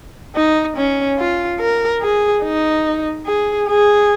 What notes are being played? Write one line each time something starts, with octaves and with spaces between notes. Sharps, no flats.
D#4
C#4
F4
A#4
G#4
D#4
G#4
G#4